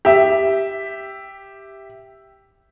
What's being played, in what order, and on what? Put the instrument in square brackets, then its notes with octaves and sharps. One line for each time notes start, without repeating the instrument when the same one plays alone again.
[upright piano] G4 E5